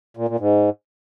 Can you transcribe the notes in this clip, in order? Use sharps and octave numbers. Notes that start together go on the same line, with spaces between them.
A#2
A#2
G#2